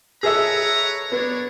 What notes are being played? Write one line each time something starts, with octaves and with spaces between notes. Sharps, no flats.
G#4 A4 B4 C#5 E5 A#5
B3 D4 C#5